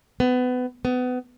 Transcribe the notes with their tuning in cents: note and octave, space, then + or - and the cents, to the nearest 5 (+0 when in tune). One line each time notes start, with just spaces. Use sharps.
B3 +25
B3 +25